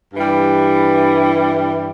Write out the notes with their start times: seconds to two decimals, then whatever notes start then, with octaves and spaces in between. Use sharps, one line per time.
0.13 G2 E3 G3